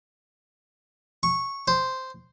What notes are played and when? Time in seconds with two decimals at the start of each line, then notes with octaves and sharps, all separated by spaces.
1.23 C#6
1.68 C5